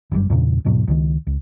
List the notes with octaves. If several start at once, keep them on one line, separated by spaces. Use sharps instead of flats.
G1 F#2 C3 G3
E2 G2 A#2 C#3
D#1 G#2 B2 F#3
C#2 D#3
C#2